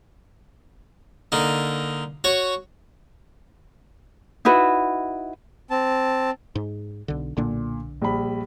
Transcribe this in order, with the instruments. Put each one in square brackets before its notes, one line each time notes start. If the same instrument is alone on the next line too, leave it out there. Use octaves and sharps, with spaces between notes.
[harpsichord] D3 A#3 D#4
F#4 C#5
[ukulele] D#4 E4 F#4 B4
[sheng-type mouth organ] C4 A5
[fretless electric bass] G#2
B1 D3
[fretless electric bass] B1 D3 D4 [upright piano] A#2
[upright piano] A#1 G3 B5